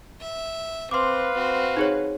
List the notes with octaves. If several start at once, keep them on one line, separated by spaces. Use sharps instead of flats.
E5
C4 B4 F5 C6 D6
C4 F#4
D#4 G#4 C#5